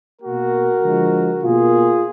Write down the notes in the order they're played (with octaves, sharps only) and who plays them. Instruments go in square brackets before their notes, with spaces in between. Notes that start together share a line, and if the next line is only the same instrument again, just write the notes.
[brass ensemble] B2 A#3 F#4 A#4
D3 F3 G#3
B2 A#3 F4 G#4